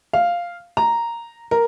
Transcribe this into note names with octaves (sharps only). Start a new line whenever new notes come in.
F5
A#5
A#4